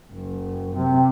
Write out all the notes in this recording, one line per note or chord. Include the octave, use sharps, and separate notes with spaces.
F#1
C3